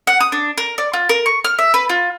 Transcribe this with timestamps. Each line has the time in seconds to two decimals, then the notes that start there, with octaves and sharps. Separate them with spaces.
0.07 F#5
0.20 D#6
0.32 D4
0.58 A#4
0.78 D5
0.93 F4
1.09 A#4
1.26 C#6
1.44 F6
1.59 E5
1.74 B4
1.89 F4